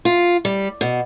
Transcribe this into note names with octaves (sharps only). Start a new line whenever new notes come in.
F4
G3
B2